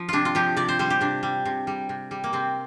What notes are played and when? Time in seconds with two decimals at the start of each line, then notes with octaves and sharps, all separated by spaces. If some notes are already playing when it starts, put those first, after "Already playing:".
Already playing: F3
0.09 C3 D4 F4
0.25 F4
0.35 F3 G4
0.57 C3 D5
0.69 C5
0.79 G3 C5
0.90 G4
1.01 C3 D4
1.23 G3
1.45 C3
1.67 G3
1.89 C3
2.11 G3
2.24 A#3
2.33 C3 C4